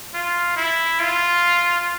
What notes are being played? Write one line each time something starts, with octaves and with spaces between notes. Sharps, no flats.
F4
E4
F4